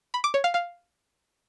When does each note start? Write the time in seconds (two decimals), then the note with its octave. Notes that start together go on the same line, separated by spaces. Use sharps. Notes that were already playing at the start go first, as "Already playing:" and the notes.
0.14 B5
0.24 D6
0.34 C#5
0.44 F5
0.54 F5